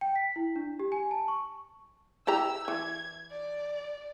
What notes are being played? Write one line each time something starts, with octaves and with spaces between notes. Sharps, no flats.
G5
B6
E4
D4
G4
G#5
A5
C#6
E4 G4 A#5 E6
E3 G#6
D5